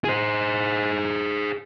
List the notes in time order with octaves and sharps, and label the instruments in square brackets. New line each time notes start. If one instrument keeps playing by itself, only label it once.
[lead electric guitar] G#4 C5